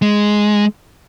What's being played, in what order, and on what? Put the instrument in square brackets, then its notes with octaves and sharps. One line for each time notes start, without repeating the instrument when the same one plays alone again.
[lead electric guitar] G#3